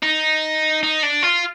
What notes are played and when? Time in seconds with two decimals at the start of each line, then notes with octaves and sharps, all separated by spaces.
0.03 D#4
0.83 D#4
1.03 D4
1.23 F4